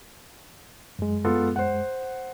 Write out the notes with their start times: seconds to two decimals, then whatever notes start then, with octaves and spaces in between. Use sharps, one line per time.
0.99 F#2 G#3
1.25 B3 F4 A4
1.56 C5 F#5